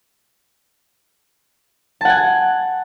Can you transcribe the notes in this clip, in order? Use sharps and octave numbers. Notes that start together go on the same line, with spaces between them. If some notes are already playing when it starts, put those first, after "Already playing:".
F#5 G#5 A5